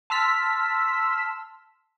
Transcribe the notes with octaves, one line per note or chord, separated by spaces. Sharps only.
A5 C6 E6 F6 B6